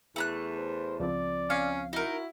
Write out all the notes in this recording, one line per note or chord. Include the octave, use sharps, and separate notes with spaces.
E2 A3 A#5 F#6
C5
C#2 F3 C4 D5
C#4 F5
D#4 E4 F#4 A#4